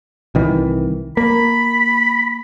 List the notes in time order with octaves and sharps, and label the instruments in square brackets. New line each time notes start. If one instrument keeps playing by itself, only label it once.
[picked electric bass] C2 D#3 E3
[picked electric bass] A#3 [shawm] B5